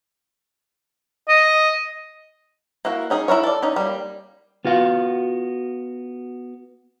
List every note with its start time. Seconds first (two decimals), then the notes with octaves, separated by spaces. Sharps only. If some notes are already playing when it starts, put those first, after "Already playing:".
1.29 D#5
2.85 A#3 E4 F#4
3.10 C#4 D#4 G#4
3.28 E4 F4 A#4 C#5
3.43 A4 D5
3.62 C#4 D#4
3.76 G3 A#3
4.65 B3 F4 F#4 F5